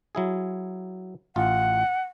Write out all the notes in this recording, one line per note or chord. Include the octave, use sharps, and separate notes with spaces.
F#3 E4 G#4
A1 F4 F#5